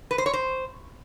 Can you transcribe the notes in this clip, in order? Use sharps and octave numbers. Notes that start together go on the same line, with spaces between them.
B4
C5
C#5
C5